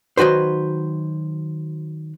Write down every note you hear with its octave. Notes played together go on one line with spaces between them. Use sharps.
D#3 F#3 F#4 B4 C5